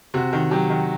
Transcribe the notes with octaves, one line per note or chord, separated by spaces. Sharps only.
C3 F#4
D#3
F#3 G4
D#3